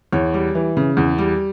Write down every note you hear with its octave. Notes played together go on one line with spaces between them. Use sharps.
E2 C#5
G3
E3
C#3
E2
G3